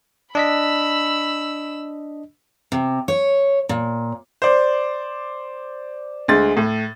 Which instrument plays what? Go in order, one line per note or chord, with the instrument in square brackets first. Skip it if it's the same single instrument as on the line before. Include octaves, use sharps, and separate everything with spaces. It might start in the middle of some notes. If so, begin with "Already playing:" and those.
[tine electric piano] D4 D#5 B6 [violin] B5 E6
[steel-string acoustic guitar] C3
C#5
A#2
[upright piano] C5 D5
D2 G#3 A6
A2